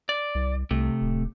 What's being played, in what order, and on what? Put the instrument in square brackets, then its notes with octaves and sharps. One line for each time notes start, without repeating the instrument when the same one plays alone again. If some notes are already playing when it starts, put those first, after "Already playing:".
[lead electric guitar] D5
[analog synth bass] C2
[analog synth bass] C2 [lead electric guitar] C3 A3
[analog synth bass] D1